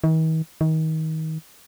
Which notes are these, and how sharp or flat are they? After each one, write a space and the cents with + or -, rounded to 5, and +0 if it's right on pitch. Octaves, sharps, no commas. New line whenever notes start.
D#3 +45
D#3 +30